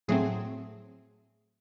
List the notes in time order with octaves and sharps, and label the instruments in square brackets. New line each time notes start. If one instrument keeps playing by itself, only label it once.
[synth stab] A2 F#3 A3 C4 G#4